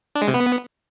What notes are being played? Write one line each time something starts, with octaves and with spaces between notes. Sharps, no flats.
D4
G#3
C3
B3